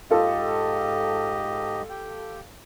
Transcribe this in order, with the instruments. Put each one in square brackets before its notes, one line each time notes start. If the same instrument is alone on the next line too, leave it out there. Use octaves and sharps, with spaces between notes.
[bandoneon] G#2 G4 D#5 [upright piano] F4 A4
[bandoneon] G4 G5